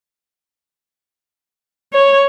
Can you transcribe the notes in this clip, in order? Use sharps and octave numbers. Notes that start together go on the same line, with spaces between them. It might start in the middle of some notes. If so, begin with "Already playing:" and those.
C#5